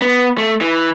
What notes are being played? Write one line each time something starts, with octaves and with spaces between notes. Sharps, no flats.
B3
A3
E3